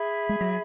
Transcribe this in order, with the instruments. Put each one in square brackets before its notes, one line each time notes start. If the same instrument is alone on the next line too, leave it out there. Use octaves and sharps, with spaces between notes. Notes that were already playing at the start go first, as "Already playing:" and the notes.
Already playing: [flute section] G#4 E5 B5
[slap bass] G#3
F#3